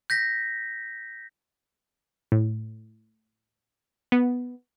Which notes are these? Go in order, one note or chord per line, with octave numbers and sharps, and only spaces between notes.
G6 A#6 B6
A2
B3